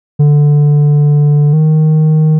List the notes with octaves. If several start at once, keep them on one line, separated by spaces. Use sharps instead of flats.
D3
D#3